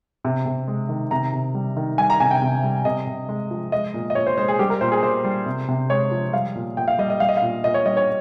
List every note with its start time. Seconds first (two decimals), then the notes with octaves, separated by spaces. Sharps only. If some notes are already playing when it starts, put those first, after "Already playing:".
0.25 C3
0.46 C3
0.68 G#3
0.89 D#3
1.11 C3 A#5
1.33 C3
1.55 G3
1.76 D#3
1.98 G3 G#5
2.10 A#5
2.20 C3 G#5
2.31 G5
2.42 C3
2.64 G3
2.85 C3 D#5
3.07 C3
3.29 G#3
3.51 F3
3.72 G#3 D#5
3.94 A#2
4.10 D#5
4.15 A#2 C#5
4.27 C5
4.38 G#3 C5
4.48 G#4
4.59 G3 G4
4.70 A#4
4.81 A#2 C5
4.92 G#4
5.03 A#2 C5
5.24 G3
5.46 C3
5.68 C3
5.90 G#3 C#5
6.11 F3
6.33 G3 F5
6.55 A#2
6.77 A#2 G5
6.88 F5
6.99 G3 D#5
7.10 D#5
7.20 G3 F5
7.29 D#5
7.37 F5
7.42 A#2
7.64 A#2 D#5
7.74 C#5
7.86 G3 D#5
7.97 C#5